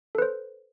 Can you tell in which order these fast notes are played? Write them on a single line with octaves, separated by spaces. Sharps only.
A4 B4 C5